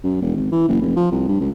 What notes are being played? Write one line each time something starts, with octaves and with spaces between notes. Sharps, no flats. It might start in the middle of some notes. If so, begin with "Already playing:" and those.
F#2
E1
G#1
E3
F#1
F1
F3
C2
G2
C#2